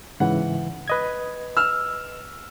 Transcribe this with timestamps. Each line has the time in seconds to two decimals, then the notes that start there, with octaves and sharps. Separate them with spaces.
0.20 G#2 C#3 E3 F#5
0.88 B4 D#5 G#6
1.57 E6 F6